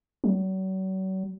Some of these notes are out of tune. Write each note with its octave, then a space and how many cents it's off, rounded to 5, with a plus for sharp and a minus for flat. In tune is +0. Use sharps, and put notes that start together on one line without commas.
F#3 +40